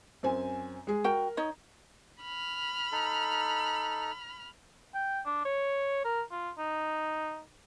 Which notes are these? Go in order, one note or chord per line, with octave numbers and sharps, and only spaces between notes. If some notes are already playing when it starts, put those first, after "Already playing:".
F#2 C4 G#5
G#3 G#4
F#4 A#4 G5
D#4 C#5 D#5
B5 F6
D#4 A4
G5
D4
C#5
A#4
F4
D#4